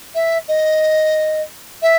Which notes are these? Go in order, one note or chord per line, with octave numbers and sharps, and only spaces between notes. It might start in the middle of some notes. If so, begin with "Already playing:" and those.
E5
D#5
E5